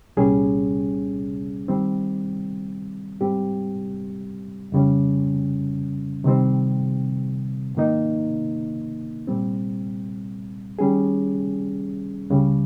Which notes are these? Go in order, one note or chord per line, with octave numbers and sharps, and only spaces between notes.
C2 A#2 G3 C#4 G#4
D#3 G3 C4
G#2 G3 C4 G4
F2 C#3 G3 C#4
C3 D#3 G3 C4
G#2 D#3 A#3 D#4
A#2 G3 C4
D#3 G3 C#4 G#4
C#2 C#3 G3